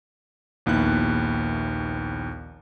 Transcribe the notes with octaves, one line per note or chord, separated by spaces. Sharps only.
A#1 D#2 B3 E4 F#6